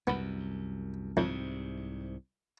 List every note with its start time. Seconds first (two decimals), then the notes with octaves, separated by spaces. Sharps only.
0.07 C2 F#2 B3
1.17 C2 F2 G#2 C3